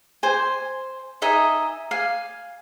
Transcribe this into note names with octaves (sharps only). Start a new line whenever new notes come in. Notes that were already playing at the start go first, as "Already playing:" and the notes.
C5 G#5
D#4 D#5 E5 G#5
F5 G#5